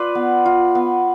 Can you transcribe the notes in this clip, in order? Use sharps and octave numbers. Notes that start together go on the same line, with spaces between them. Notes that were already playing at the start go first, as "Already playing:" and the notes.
Already playing: F4 B4 D5
B3
F4
B3